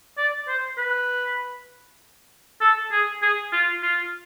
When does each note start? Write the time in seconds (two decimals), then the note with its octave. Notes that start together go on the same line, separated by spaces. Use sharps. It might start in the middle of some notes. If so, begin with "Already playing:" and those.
0.18 D5
0.48 C5
0.78 B4
2.61 A4
2.92 G#4
3.22 G#4
3.53 F4
3.83 F4